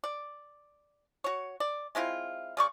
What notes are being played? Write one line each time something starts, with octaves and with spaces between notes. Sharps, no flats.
D5
F#4 C#5
D5
G#3 C4 E4 F4
C#3 D5 C#6